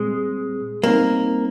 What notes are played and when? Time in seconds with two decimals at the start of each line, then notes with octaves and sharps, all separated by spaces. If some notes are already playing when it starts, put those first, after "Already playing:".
Already playing: A#2 G3 G#3 C4
0.83 G3 A#3 C4 D#4